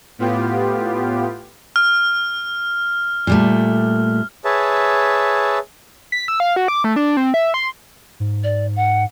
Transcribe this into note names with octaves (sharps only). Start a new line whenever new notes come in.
A2 B3 F4 G4
F6
A#2 G3 A3
G#4 B4 C#5 E5 A5
B6
E6
F5
F#4
D6
A3
D4
C4
E5
C6
G#2
D5
F#5